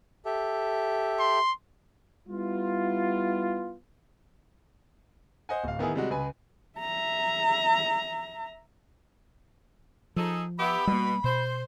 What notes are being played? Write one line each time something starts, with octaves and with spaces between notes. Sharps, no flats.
G4 A4 E5
C6
G3 B3 E4 F4
C5 D#5 F#5 G#5
D1 F5
D#3 B3 E4 G#4
C3 G3 G#3 F#4
C#2 B4 G#5
E5 A#5
F3 D#4 G#4 A4
B3 G4 E5 B5
B2 G3 A#3
B2 C5